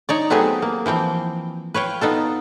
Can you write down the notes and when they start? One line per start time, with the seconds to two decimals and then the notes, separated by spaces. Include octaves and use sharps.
0.09 D#4 C#5 D5
0.30 F#3 A3 B3 C4 G4 G#4
0.62 A#3
0.86 E3 F3 C4 G5
1.74 B4 C#5 F5 G5
2.01 B3 D#4 F4 A4